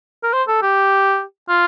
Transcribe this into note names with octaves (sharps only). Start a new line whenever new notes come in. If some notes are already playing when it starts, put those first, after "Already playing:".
A#4
C5
A4
G4
F4